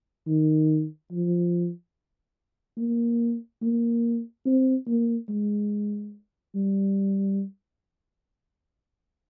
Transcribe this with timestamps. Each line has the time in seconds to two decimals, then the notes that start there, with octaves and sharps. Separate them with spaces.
0.27 D#3
1.11 F3
2.78 A#3
3.62 A#3
4.46 C4
4.88 A#3
5.29 G#3
6.55 G3